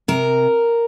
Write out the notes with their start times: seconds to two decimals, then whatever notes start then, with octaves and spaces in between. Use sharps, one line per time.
0.08 C3 A#4